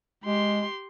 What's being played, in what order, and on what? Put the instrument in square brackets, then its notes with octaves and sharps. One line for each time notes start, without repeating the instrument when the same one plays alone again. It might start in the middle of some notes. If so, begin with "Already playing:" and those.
[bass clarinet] G#3 [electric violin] G4 C6